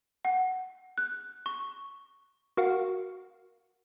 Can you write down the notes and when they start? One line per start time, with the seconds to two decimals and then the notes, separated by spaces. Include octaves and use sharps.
0.25 F#5
0.98 F#6
1.46 C#6
2.57 F#4 A#4 F5 F#5